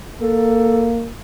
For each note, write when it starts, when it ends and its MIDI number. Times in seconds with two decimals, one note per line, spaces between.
0.21 1.10 58
0.21 0.90 69